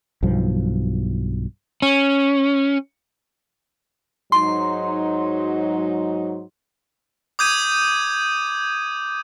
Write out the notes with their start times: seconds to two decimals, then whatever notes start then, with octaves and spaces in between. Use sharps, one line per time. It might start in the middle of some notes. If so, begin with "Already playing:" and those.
0.23 B1 G2 F3
1.82 C#4
4.32 G#2 F#3 D#4 C6
7.39 D6 D#6 G6 G#6 D#7